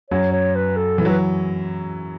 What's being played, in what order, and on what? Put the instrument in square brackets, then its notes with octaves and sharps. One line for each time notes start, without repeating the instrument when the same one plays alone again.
[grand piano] F#2 F#3 [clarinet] C#5
[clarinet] C#5
B4
A4
[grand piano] E3 [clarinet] A4
[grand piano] F#3
[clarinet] B4